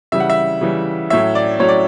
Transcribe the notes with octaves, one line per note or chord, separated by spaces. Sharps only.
C#3 E3 G3 E5
F#5
E5
C#3 E3 G3
A2 F#3 C#4 E5
D5
A2 F#3 C#4 C#5
D5